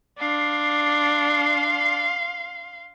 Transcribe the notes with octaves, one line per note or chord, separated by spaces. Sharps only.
D4 F5 C6